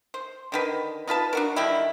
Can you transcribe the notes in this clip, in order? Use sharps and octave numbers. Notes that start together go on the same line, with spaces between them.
C5
D3 D#3 B4
D#4 F4 B4 A5
D4 F#4 A#4
D3 D#3 G3 E4